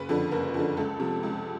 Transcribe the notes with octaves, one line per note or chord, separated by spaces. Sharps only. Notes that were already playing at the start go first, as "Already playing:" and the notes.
Already playing: F#1 B4
F2 D3
F#1 A#4
F2
D3
C#2 A4
C3 F3
C#2